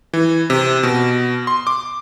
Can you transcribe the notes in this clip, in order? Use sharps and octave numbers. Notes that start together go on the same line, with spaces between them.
E3
C3
B2
C6
D6